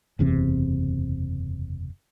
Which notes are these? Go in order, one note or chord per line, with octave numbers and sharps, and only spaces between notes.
F#1 E2 C3 C4